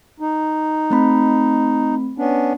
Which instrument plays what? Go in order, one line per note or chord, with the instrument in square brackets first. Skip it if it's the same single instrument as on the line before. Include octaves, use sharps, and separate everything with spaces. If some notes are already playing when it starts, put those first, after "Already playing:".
[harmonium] D#4
[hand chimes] A3 C4 B5
[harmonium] B3 C#4 D4